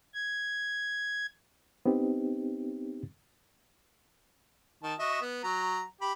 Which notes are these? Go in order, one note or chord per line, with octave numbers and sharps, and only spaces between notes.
G#6
B3 C4 D#4 G4
D#3 A5
F#4 D#5 E5
B3
F#3 A#5
G4 B5